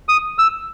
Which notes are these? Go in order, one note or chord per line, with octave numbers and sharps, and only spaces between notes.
D#6
E6